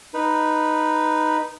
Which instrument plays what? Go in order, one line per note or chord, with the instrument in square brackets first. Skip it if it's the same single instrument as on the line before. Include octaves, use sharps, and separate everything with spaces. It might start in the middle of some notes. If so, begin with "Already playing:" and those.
[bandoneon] D#4 B4